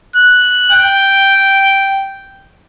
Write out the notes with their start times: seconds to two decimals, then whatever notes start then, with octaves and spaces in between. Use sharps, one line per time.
0.16 F#6
0.71 G5